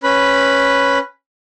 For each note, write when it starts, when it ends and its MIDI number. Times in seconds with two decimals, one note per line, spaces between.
0.04 0.98 61
0.04 0.98 71
0.04 0.98 83